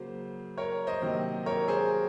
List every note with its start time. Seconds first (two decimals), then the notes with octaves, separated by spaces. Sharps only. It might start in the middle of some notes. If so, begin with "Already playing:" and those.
Already playing: C#3 F#3 A#3 C5
0.57 A#4 C#5
0.87 C5 D#5
1.02 C3 D#3 F#3 A#3
1.46 A#4 C#5
1.68 G#4 C5